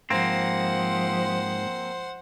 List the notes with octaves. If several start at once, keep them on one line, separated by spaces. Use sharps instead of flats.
G#2 F3 A#3 C4 C5 F#5